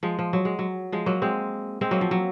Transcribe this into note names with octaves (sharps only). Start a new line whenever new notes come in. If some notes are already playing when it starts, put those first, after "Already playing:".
F3 G#3
F3
F#3
G#3
F#3
F3 G#3
F#3 A#3
G#3 C4
G#3 C4
F#3 A#3
F3
F#3